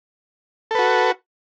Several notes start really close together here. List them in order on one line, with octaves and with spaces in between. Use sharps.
A4 B4 F#4